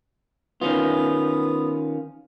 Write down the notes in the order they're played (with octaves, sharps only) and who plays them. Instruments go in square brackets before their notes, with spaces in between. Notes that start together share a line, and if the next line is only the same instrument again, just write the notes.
[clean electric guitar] D#3 C#4 F4 [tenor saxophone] B3